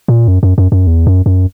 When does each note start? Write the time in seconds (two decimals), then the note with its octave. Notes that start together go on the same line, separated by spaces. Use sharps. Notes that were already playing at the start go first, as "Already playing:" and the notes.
0.08 A#2
0.28 F#2
0.43 F#2
0.58 F#2
0.72 F#2
0.87 E2
1.07 F#2
1.26 F#2